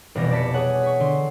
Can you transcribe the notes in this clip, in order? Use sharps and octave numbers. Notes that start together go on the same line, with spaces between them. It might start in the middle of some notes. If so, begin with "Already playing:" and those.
F1 B2 E3 G3 B3 A#6
D5 A5 B6 C#7
G#4 C#5 F#5
C#6 B6
D3 C6